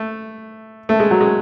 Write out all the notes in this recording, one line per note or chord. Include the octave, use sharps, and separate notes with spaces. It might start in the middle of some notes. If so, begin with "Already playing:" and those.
Already playing: A3
A3
G#3
F#3
G#3